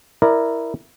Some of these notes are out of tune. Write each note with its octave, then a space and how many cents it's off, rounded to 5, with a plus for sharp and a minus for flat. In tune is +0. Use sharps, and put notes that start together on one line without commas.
E4 +0 A#4 +0 D5 +20